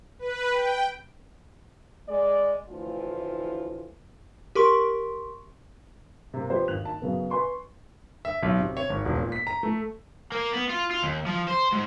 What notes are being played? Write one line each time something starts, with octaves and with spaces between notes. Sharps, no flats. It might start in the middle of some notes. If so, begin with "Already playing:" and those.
B4
G5
G#3 D5
D2 A2 E3 F3 F4
G4 A#4 C6 C#6
C3 A#3
F3 G4 B4 C5
G#1 D#2 F#6 F7
A5
F#2 C#3 B3
B4 G#5 C6 C#6
E5
B1
C3
C#5
G#1
E1
A#2
B6
A#5
A3
A#3
B3
F4
F4
D#2
F3
C5
G#2